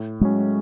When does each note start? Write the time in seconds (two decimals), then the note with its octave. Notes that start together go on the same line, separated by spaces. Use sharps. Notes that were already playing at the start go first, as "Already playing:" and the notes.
Already playing: A2
0.21 F#3 G#3 C#4